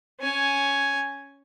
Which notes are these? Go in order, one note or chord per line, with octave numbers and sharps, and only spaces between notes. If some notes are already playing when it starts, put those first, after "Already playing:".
C#4 G#5